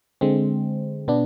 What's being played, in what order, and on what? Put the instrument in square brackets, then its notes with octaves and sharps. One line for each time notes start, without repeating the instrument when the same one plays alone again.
[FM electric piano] D3 G#3 C4
B2 B3 D4